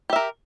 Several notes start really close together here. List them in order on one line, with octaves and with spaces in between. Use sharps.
G4 E5 A#4